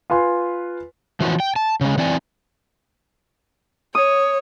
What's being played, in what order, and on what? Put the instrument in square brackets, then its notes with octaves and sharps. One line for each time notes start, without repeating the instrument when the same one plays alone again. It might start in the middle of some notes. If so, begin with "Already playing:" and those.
[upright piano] F4 B4 G#5 C6
[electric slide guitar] E3 F3 C#4 F#4
G5
A5
C#3 G#3
E3 C4 D5 G5 G#5
[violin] C#5 [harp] D#6